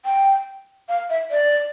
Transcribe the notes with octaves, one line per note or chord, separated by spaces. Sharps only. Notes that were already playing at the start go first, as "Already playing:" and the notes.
G5
F5
E5
D5